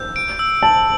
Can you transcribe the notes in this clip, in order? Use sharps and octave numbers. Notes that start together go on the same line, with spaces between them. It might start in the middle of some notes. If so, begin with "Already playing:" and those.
Already playing: E6 G6
D7
E6
A5 F#7